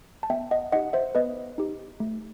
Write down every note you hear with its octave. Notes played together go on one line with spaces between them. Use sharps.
A5
B3 E5 G5
D#5 F#5
D#4 G4 D#5 F#5
C5 E5
B3 B4 D#5
D#4 G4
A3